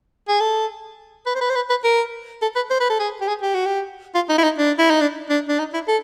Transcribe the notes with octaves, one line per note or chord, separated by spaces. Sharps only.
G#4
A4
B4
C5
B4
C5
B4
B4
A#4
A4
B4
C5
B4
A4
G#4
G4
G#4
G4
F#4
G4
F4
D#4
E4
D#4
D4
E4
D#4
D4
D4
D4
D#4
E4
A4